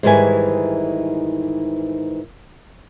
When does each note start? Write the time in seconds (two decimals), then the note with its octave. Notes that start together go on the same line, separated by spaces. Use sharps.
0.03 G#2 D#3 E3 G3 B4 G#5